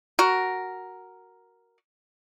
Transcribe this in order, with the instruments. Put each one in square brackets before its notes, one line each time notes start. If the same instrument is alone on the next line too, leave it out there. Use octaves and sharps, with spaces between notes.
[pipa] F#4 A#4